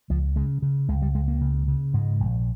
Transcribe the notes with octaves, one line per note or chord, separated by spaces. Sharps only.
C#2 F3
C#3 G#3
C#3
C#2 G#3
G3
C#2 G#3
A#3
C#3
C#3
G#2 G#3
A#1